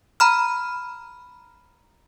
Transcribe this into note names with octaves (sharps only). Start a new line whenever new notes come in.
A#5 B5 F6